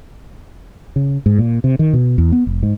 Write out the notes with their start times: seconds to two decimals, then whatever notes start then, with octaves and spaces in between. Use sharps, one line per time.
0.96 C#3
1.26 G#2
1.39 A#2
1.64 C3
1.79 D#3
1.93 B2
2.18 E2
2.32 B3
2.47 F1
2.63 G#2